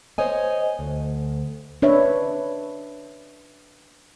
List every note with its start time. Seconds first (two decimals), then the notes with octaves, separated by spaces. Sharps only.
0.18 C5 C#5 D#5 G#5
0.79 D2
1.82 D4 B4 C#5 E5